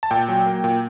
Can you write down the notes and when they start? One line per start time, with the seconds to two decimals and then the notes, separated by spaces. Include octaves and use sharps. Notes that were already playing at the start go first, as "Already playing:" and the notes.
0.03 A5
0.11 A#2 G5
0.28 F#3
0.46 A#3
0.64 A#2